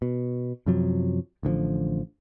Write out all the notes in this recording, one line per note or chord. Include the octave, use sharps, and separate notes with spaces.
B2
F#2 C3 F3 F#3
A1 D3 E3 F3